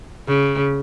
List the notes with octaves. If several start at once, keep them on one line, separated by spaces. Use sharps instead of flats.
C#3